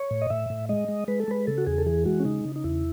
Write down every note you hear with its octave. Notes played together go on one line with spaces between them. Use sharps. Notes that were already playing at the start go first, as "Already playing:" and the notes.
Already playing: C#5
A2
D#5
A2 E5
A2
G#3 D#5
G#3
G#3 B4
A4
G#3 B4
C#3 A4
F#4
E2 G#4
A4
E3 G#4
G#3 F#4
C#4
C#3 D#4
C#3
D#4
E2 E4